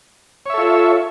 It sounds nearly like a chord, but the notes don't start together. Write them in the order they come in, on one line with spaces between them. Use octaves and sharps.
C#5 E5 A4 F4